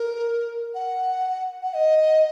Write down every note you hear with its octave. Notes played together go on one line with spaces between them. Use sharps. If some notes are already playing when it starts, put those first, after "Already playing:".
Already playing: A#4
F#5
F#5
D#5